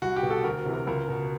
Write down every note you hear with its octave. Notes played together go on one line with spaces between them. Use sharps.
C2 F#4
G4
B2
A4
D2 A#4
C3 E3
A#4
C#2 A#4
B2